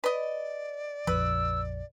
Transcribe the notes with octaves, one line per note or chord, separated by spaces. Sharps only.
B4 D5 D#5
A#1 F2 F3 B4 E6